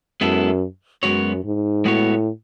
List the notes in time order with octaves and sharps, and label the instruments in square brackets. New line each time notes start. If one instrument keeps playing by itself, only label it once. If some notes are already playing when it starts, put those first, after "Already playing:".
[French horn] F#2 [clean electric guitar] G#3 B3 E4 A4
[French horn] F#2 [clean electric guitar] G#3 B3 F#4 C#5
[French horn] G#2
[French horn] A2 [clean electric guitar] G#3 B3 F#4 C#5